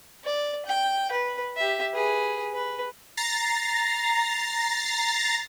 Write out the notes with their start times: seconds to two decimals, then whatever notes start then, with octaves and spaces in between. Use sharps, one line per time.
0.24 D5
0.65 G5
1.11 B4
1.57 G4 E5
1.94 G#4 B4
2.54 B4
3.17 A#5 A6 A#6 C7